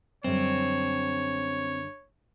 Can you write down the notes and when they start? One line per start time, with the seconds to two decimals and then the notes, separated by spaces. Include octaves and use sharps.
0.24 F#2 D3 G3 C4 C#5